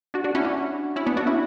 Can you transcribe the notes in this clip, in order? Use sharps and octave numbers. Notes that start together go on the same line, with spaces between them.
D4 F#4
D4 F#4
C#4 E4
D4 F#4
C#4 E4
B3 D4
D4 F#4
C#4 E4